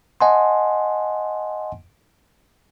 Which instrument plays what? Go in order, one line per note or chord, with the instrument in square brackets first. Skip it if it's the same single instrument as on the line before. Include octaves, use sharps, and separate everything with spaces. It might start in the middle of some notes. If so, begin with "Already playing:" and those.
[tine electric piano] D#5 F#5 G#5 A5 C6